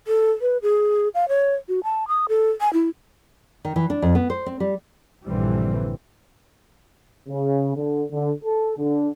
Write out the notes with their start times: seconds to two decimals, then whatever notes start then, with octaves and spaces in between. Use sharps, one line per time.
0.07 A4
0.41 B4
0.62 G#4
1.15 F5
1.29 C#5
1.69 F#4
1.84 A5
2.08 D#6
2.29 A4
2.61 G#5
2.73 E4
3.65 D#3
3.76 E3
3.90 D4
4.02 F2
4.15 B3
4.30 C5
4.46 C4
4.60 G3
5.26 A#1 G2 D3 E3 G3 C4
7.28 C#3
7.75 D3
8.11 D3
8.43 A4
8.78 D3